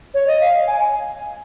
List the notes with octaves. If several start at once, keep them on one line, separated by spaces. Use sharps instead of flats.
C#5
D#5
F5
G#5